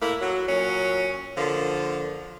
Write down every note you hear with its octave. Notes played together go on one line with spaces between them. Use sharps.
A2 A#3 E4
F#3
A#2 F#3 C#4
D3 F3 A#3